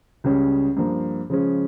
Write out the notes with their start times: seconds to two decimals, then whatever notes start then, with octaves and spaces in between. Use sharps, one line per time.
0.24 C#2 C#3 G3 C#4 G#4
0.77 G2 F3 A#3
1.30 C#3 F3 G#3 C#4